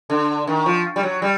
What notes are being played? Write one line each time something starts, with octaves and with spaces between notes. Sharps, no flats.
D3
D#3
F3
G3
F#3
G3